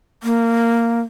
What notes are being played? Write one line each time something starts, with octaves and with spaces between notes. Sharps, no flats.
A#3